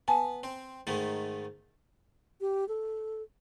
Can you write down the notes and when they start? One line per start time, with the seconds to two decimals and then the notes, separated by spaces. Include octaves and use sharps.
0.08 B3 G#5 A5
0.43 C4
0.87 G#2 D#3 A3
2.41 G4
2.68 A4